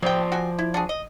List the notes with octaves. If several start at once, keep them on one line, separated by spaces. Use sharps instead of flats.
C3 F3 C5 D5 G5
F#4 G5 G#5
E4
D4 F#4 G#4
D#5